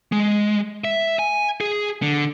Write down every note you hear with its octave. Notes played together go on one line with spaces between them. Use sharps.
G#3
E5
G#5
G#4
D3